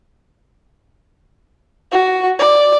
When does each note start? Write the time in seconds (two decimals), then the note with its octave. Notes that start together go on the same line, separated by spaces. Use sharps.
1.92 F#4
2.39 D5